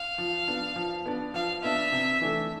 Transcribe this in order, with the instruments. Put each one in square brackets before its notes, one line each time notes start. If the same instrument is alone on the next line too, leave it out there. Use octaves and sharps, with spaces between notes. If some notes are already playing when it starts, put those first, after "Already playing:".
Already playing: [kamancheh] F5
[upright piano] F3
B3 D4
F3
B3 D4
[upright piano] F3 [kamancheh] F5
[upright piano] B3 D4 [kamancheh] E5
[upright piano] C3
E3 A3 D4